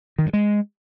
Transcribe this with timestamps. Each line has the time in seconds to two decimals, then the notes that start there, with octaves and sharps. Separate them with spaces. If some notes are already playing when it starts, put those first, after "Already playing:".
0.18 D#3
0.26 G2
0.33 G#3